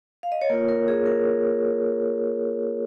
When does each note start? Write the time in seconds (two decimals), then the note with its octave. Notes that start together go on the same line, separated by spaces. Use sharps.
0.23 F5
0.32 D#5
0.41 C#5
0.49 A#3 F4 A#4
0.69 A#4
0.88 G#4
1.06 A#4